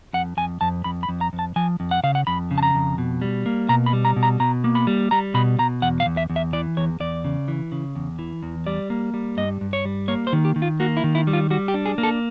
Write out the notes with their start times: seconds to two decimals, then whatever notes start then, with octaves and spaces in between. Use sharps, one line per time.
0.13 F2 F#5
0.37 F2 G#5
0.61 F2 A5
0.84 F2 B5
1.03 B5
1.09 F2
1.21 A#5
1.33 F2
1.39 A5
1.56 F3 G#5
1.80 F2
1.91 F#5
2.03 C#3 F5
2.15 F#5
2.27 F2 B5
2.51 C#3
2.58 A5
2.63 A#5
2.75 F2
2.98 B2
3.22 G3
3.46 A#3
3.69 B2 A#5
3.86 B5
3.93 G3
4.05 A#5
4.16 B2
4.23 A#5
4.40 B2 A#5
4.64 A#3
4.75 B5
4.87 G3
5.11 G3 A#5
5.34 B2 B5
5.59 B2 A#5
5.82 E2 F#5
6.00 F5
6.06 E2
6.17 E5
6.30 E2
6.36 E5
6.53 E3 D5
6.77 E2 C#5
7.00 E2 D5
7.25 C#3
7.48 E3
7.72 C#3
7.95 E2
8.19 E3
8.43 E2
8.66 G3 D5
8.90 A#3
9.14 G3
9.37 G2 D#5
9.61 G2
9.73 C#5
9.85 G3
10.08 A#3 C#5
10.27 C5
10.33 D#3
10.45 G4
10.56 D#3
10.62 F4
10.80 A#3 F#4
10.97 E4
11.04 D#3
11.15 E4
11.27 G3
11.33 F4
11.50 G3 F#4
11.68 G4
11.74 D4
11.86 G#4
11.98 A#3
12.03 A4